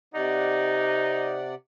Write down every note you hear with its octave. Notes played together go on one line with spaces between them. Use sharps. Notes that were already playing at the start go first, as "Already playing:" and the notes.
C3 D#4 D5 F#5